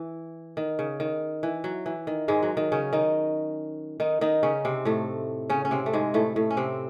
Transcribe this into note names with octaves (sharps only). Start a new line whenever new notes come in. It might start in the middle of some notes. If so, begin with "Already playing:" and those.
Already playing: E3
D#3
C#3
D#3
E3
F#3
E3
D#3
G#2 G#3
F#3
D#3
C#3 C#4
D#3 D#4
D#3 D#4
D#3 D#4
C#3 C#4
C3 C4
A2 A3
C#3 C#4
C#4
C3 C4
A3
G#2 G#3
A2 A3
A2 A3
C#4
C3 C4